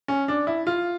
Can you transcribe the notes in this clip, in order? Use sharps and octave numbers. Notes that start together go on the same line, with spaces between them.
C#4
D4
E4
F4